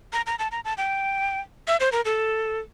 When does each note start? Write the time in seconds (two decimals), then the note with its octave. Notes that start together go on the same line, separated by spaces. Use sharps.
0.13 A#5
0.26 A#5
0.39 A5
0.51 A#5
0.65 A5
0.78 G5
1.67 E5
1.80 C5
1.92 A#4
2.05 A4